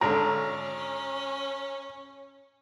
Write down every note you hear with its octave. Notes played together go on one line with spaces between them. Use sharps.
G#1 D3 C#4 A#5